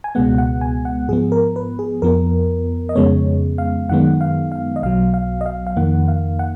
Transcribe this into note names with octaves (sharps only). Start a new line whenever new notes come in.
G#5
C#2 B2 G#3 B3 F#5
F#5
G#5
F#5
G#2 F3 B3 G#4
A#4
B4
G#4
F2 F3 B3 A#4
D#5
F2 C#3 G#3 B3 C#5
F5
F#2 D#3 G#3 B3 F#5
F5
F5
D#5
B1 B2 F#3 F5
F5
D#5
F5
F5
F2 D#3 A#3 F#5
F5
F#5